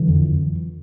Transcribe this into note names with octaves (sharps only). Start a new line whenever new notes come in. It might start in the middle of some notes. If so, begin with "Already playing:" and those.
Already playing: D3 E3 F#3
F2